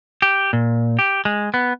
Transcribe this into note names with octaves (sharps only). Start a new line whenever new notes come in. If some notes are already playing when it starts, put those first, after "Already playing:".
G4
A#2
G4
G#3
B3